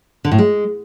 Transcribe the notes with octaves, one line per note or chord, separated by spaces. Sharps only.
D3
A2
G#3